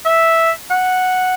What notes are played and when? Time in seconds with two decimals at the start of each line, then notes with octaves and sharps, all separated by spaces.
0.06 E5
0.71 F#5